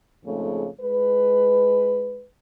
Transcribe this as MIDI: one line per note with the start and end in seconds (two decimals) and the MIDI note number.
0.24 0.67 41
0.24 0.67 44
0.24 0.67 49
0.24 0.67 57
0.80 2.24 56
0.80 2.24 71